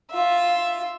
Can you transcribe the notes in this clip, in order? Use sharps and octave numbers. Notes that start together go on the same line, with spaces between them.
F4 E5